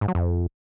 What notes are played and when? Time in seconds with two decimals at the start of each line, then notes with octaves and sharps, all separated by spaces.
0.01 G#2
0.08 F#3
0.15 F2